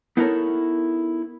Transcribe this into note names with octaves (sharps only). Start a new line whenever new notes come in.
B3 D#4 E4 A4 A#4 C#5